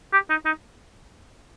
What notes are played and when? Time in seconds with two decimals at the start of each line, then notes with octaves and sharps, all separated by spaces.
0.13 G4
0.30 D#4
0.45 D#4